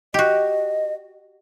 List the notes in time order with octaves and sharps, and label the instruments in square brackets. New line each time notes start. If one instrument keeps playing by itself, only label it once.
[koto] F#4 G4 [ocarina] D#5